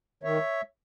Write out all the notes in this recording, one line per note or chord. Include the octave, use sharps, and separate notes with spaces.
D#3 C#5 E5